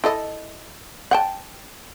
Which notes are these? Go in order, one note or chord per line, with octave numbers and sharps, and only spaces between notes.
E4 A4 D#5
F#5 G5 A5